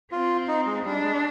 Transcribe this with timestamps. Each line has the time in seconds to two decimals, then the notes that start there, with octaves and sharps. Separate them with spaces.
0.12 C4 F4
0.48 D#4
0.67 G#3
0.85 G3 D4
1.04 G#3